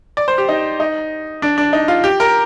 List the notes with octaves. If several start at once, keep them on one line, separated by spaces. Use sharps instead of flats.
D5
C5
G4
D#4
D#4
D4
D4
D#4
F4
G4
A#4